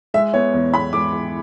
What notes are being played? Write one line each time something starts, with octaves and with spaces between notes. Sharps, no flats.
G#3 E5
B3 C#5
E2
B3 B5
G#3 D6
E2